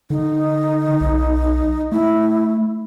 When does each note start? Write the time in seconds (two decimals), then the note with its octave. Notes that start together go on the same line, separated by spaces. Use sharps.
0.10 D3 D#4
1.01 B1
1.92 A3 E4